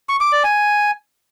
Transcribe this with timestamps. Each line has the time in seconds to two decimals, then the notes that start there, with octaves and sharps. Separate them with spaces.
0.09 C#6
0.21 D6
0.32 D5
0.44 G#5